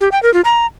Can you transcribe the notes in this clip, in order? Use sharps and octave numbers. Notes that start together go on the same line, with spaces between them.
G4
G5
A#4
F4
A#5